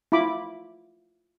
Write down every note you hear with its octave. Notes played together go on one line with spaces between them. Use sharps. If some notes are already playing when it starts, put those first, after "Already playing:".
E4 F4 B5 D6